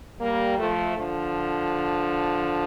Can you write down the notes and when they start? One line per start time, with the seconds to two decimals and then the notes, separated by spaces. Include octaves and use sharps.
0.21 G3 A#3
0.59 F3 A3
0.98 D3 F3